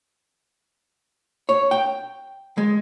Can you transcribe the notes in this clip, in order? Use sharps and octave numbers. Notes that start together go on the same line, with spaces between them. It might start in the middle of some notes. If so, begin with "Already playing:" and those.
C#5
G5
G#3